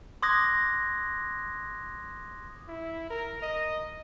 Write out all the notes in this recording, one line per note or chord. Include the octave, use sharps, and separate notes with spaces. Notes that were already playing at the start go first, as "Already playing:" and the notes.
C6 D6 D#6 F#6 G#6 A#6
E4
A#4
D#5